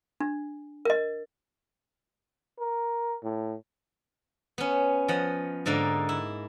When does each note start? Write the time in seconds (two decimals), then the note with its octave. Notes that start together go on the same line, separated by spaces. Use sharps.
0.20 D4
0.85 A#4 D#5
2.59 A#4
3.23 A2
4.58 B3 C#4
5.08 F3 D#5 F#5
5.66 G#2 D3 A#3 D#4
6.09 E4